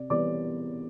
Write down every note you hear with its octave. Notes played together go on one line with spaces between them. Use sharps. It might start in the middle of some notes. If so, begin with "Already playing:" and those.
Already playing: C3 D5
E3 G3 B3 D5 D6